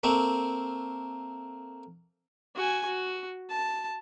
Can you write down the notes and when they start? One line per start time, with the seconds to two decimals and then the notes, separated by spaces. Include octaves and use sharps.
0.03 A3 A#3 C4
2.56 F#4 G#5
2.85 F#4
3.50 A5